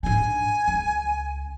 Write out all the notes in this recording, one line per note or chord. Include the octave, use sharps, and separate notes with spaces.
G#2 D4 G#5
C#2